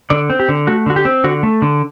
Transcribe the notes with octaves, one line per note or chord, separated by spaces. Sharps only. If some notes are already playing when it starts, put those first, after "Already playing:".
D3 D5
C4
G4
D3
A3 F#4
D3 F#4
G4
C4
D3 F#4
A3
D3